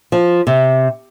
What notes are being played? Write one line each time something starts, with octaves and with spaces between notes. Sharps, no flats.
F3
C3